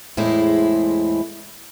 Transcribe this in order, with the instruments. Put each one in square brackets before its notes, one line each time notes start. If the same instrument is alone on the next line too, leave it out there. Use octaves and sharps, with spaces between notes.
[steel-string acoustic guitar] E2 A2 G#3 E4 C5